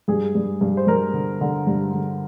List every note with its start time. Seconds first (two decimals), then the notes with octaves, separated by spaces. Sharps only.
0.08 G2 G#4
0.35 G2
0.61 G2
0.77 C5
0.87 G2 A#4
1.14 D3
1.41 D3
1.67 G2
1.94 D3